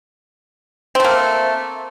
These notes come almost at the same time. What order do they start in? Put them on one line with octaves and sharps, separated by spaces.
C4 A3 A#3